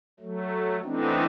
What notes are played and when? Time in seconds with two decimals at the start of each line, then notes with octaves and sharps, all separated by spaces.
0.20 F#3 A3
0.84 E3 A3 B3 C4 D4 D#4